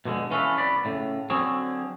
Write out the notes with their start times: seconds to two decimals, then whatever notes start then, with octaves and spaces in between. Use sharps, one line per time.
0.05 B2 D3 F#3 G#3
0.31 E3 C#4 F4 A4 B4
0.57 C2 B3 D5 B5
0.85 A2 C#3
1.30 D3 F#3 C4 G#4 C#5